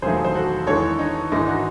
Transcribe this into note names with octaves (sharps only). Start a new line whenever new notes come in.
E1 D#2 D#3 F#3 A3 G#4 C5
C5
F#4 A4
E2 D#3 G#3 A4 C#5
D#4
A1 G#2 D#3 G#3 E4
D#4 F#4